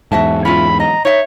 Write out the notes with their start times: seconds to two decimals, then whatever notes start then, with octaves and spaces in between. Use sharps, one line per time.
0.12 E2 G#2 F#4 E5 A5
0.45 C#4 E4 F4 B5
0.80 D#5 A#5
1.05 D#4 C#5 E5